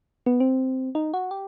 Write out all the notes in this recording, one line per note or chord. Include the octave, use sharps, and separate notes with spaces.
B3
C4
D#4
F#4
G4